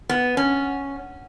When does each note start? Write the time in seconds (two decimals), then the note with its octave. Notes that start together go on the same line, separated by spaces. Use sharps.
0.09 B3
0.37 C#4